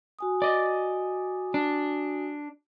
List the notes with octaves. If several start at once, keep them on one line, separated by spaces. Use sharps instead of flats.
F#4 G#5 D#6
D5 D#5
D4